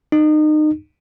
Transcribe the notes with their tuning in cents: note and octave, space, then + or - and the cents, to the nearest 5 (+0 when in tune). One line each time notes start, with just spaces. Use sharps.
D#4 -30